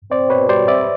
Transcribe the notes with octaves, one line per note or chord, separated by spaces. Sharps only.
C4 C5 D5
B2 B4 C#5
G3 C5 D5
C4 D5 E5